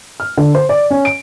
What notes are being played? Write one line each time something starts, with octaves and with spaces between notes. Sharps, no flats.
F6
D3
C5
D5
C#4
D7